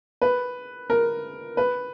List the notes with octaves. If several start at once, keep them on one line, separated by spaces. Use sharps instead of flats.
B4
A#4
B4